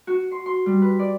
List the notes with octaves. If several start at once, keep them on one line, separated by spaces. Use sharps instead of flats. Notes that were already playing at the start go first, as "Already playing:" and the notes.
F#4
C6
C6
G3
B4
D5